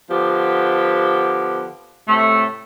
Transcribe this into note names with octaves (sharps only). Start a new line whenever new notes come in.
D3 F3 B3 G4
A2 C3 A3